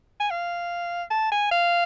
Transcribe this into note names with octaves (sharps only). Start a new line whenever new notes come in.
G#5
F5
A5
G#5
F5